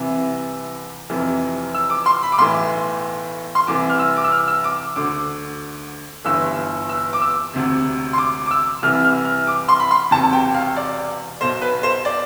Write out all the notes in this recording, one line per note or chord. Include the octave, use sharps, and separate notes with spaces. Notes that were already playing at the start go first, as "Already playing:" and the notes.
Already playing: C2 C3 E3
F1 F2 C3 E3
E6
D6
C6
B5
D6
B1 A2 E3 C6
C6
C2 C3 E3 D6
F6
E6
D6
E6
F6
E6
D6
D2 D3 D6
G1 G2 E3 E6
E6
D6
E6
E1 D2 C3
C6
D6
D6
E6
C2 C3 E3 F6
F6
F6
D6
C6
B5
C6
E1 E2 C3 A5
G5
F5
D5
B1 B2 C5
B4
C5
D5